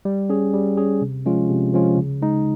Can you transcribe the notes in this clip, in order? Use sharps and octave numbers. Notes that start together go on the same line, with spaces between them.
G3
C#4 G#4
G3
C#4 G#4
C3
F3 G#3 C#4 F4
C3
F3 G#3 C#4 F4
C#3
G#3 D#4